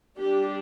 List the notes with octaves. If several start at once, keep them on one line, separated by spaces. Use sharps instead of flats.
G3 D4 G4